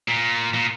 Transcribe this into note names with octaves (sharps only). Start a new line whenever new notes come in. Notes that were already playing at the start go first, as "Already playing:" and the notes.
A#2
A#2